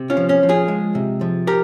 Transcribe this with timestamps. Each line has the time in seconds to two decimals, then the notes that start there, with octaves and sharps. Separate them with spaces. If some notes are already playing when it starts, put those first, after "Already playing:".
Already playing: C3
0.10 C#4 F4
0.17 F3
0.29 C#4
0.43 F3
0.49 F4 G#4
0.68 G#3
0.95 C3
1.21 F3
1.47 G4 A#4